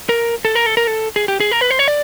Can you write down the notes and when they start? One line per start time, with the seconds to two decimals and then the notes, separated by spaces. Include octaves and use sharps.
0.09 A#4
0.45 A4
0.55 A#4
0.66 A4
0.77 A#4
0.87 A4
1.16 G#4
1.28 G4
1.40 G#4
1.52 A#4
1.61 B4
1.71 C5
1.79 C#5
1.88 D5